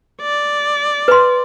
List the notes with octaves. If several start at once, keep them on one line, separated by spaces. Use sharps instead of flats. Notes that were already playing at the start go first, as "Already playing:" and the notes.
D5
B4 C6